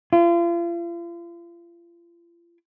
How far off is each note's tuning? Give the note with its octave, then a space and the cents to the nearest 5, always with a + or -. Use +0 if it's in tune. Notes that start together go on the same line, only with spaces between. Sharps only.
F4 -40